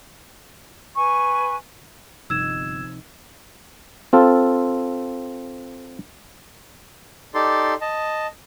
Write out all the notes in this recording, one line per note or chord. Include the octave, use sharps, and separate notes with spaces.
B4 G#5 C#6
G1 C3 F3 D#4 E6 G#6 E7
C4 F4 A4
D#4 G4 A4 D5 C6
D#5 A5